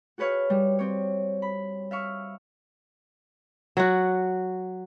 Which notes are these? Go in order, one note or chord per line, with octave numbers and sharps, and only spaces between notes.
F#4 G#4 B4 C#5 F5
G3
C4 C#5
B5
E5 F5 C#6
F#3 F#4